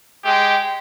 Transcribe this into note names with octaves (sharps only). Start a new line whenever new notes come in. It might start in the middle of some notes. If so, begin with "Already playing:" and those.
G#3 G4 G5